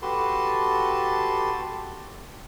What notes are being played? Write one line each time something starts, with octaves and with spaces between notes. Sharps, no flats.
F#4 G4 A4 B4 A5 C6